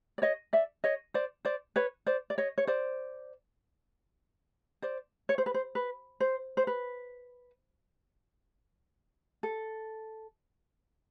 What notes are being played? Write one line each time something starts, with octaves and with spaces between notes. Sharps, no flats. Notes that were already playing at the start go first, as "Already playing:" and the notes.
D5
C#5 D#5
D5 E5
C#5 D#5
C5 D5
C5 D5
B4 C#5
C5 D5
D5
C#5 D#5
C#5
C5 D5
C5 D5
C#5
C5
B4
C5
B4
C5
C5
B4
A4